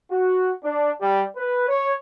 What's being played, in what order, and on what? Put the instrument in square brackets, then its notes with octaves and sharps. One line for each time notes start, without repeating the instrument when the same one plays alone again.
[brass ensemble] F#4
D4
G3
B4
C#5